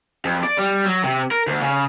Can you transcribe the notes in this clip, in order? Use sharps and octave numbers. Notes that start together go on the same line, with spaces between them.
F2
D5
G3
F#3
C3
A#4
D2
C#3